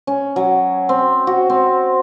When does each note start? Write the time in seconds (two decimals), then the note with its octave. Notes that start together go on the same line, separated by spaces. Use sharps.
0.07 C#4
0.36 F#3
0.89 C4
1.27 F#4
1.50 C4